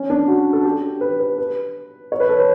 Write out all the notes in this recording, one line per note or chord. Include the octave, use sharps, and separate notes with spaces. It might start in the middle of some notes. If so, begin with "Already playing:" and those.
Already playing: C#4
D4
F#4
A4
G4
B4
B4
B4
C#5
B4
A4
B4